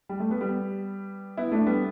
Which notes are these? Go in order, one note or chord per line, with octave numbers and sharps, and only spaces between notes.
G3
A3
G3 B3
G3 B3
B3 E4
A3 D4
G3 B3